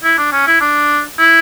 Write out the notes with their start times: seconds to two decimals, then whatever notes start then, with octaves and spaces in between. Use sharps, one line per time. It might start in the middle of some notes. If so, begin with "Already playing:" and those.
0.04 E4
0.18 D4
0.33 C#4
0.47 E4
0.61 D4
1.19 E4